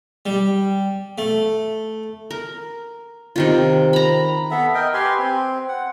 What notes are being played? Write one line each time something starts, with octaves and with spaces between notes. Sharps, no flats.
G3
A3
A#4
C3 D#3 F4
A#5 B5
B3 A4 E5
A#4 D#5 G5
G4 B4 G#5 C6
C4
F#5